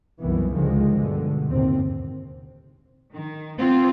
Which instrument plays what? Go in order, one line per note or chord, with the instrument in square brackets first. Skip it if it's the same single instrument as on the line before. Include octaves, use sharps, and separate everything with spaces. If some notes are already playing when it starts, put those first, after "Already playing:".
[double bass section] C2 F#2 D#3 E3 B3
C#2 D3 D#3 F3 G#3
G2 B2 D3
D#2 A2 C3 C4
[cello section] D#3
B3 C4 F4